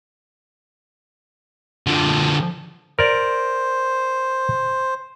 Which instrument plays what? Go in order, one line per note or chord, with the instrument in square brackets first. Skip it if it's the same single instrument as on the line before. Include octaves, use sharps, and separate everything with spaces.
[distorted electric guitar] D3 F3
[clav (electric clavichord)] A#4 D5 [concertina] C5